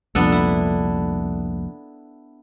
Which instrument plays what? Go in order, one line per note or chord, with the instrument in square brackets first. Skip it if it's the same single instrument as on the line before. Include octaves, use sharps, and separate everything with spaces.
[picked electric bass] C2 F2 A#2 [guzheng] B3 D4 A4
[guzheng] E4